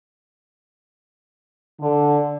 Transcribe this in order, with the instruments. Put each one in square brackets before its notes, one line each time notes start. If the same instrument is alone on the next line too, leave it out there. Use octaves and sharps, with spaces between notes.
[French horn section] D3